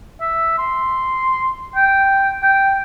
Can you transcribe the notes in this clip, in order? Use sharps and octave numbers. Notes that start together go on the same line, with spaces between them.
E5
C6
G5
G5